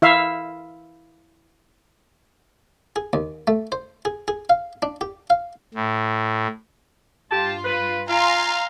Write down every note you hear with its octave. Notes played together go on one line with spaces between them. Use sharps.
E4 E5 F5
G#4
D#2
A3
C5
G#4
G#4
F5
D4
G4
F5
A2
G2 F4 G4 A5
B4
F4 F5 G#5 A#5 C6